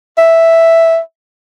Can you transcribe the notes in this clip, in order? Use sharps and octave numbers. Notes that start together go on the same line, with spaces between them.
E5